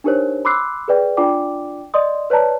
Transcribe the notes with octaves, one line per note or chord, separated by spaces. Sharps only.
D4 D#4 G4 A#4 C5 C#5
B5 C6 D6 E6 F#6 C7
G#4 B4 D5 G5
D4 F4 D5 G5 D6
D5 D#5 C6 D#6
B4 C#5 D5 A5 A#5